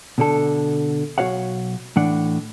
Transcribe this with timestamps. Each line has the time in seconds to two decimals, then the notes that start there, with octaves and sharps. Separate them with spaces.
0.18 B2 D3 A4
1.18 B1 F3 F#4 C#5 F5 F#5
1.96 A2 E3 D4 F#5